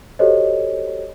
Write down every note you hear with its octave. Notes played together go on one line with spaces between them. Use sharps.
F#4 G4 A4 C5 C#5 D#5